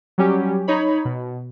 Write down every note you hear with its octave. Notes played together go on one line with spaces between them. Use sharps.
F#3 G3 C#4 G4
D#4 C#5 B5
B2